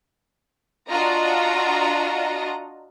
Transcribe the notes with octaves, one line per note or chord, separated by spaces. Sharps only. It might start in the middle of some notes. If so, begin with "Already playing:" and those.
D4 F4 F#4 D#5 A#5